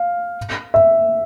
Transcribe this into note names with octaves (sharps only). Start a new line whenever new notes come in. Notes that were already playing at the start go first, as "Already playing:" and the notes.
Already playing: F5
E5